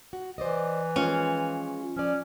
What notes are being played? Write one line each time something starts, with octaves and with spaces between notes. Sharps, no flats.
F#4
E3 C5 D5 D#5
F3 G#3 C#4 F4
F3 C#4 D5